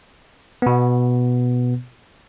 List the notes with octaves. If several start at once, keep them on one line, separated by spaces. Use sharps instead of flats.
B2 B3